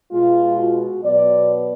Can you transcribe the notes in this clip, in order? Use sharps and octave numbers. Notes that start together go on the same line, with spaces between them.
B2 G#3 B3 F4
F#4
B2 F#3 B3 D5